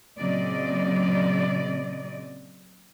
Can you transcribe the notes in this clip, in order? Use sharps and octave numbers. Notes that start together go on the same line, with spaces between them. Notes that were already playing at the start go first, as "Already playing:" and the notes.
A#2 C#3 F#3 C4 D5 D#5